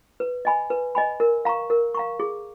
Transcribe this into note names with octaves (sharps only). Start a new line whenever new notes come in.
B4
D#5 G#5 B5
B4
D#5 G#5 B5
A#4
F5 A#5 C#6
A#4
F5 A#5 C#6
G#4